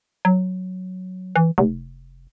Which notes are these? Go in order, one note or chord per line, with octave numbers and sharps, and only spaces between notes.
F#3
E3
F1